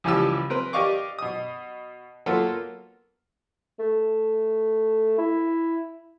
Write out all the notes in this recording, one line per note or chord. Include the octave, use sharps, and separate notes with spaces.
C#2 E3 F3 G3 G4 E6
C4 A#4 B4
G4 D5 D#5 F5 C#6 D6
B2 D#6
F#3 A#3 B3 F4 A4
A3
E4